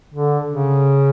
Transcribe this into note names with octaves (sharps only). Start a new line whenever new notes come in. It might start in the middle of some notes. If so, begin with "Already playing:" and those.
D3
C#3